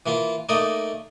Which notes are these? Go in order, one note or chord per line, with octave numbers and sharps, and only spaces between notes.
E3 A#3 F4
A3 A#3 D#4 D5 D#5